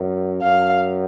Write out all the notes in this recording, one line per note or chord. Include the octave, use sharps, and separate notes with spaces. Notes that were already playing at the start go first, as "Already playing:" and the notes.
Already playing: F#2
F#2 F5